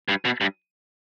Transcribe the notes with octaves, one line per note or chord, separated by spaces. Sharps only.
G2
B2
G2